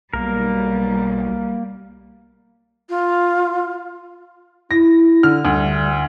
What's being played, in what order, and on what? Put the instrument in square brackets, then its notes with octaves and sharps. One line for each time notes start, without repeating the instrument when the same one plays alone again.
[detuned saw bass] B1 [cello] G3 [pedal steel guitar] A#3 A#4
[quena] F4
[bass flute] E4 [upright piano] A#6
[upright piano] D3 F6
[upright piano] D2 [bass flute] G3